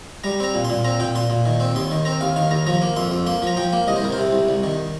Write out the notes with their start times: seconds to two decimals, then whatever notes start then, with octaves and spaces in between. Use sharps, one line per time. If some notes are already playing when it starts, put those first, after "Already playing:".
0.24 G3 A#5
0.40 C4 A#5
0.54 A#2
0.65 C6
0.70 A#2
0.85 C4 A#5
1.00 A#2 G5
1.15 A#2 C6
1.30 A#2
1.46 D#3
1.60 C4
1.75 D#2 C6
1.91 D#3
2.05 C4 A#5
2.21 D#2 F5
2.36 D#3 F5
2.51 D#2 A#5
2.67 F3 A#5
2.82 A#3
2.96 F2 C6
3.11 F2
3.26 A#3 C6
3.42 F3 A#5
3.57 F3 G5
3.73 A#3
3.87 C2 D#5
3.96 C5
4.02 C2 A#4
4.12 C5
4.18 C3
4.32 C2
4.49 C2
4.63 D#3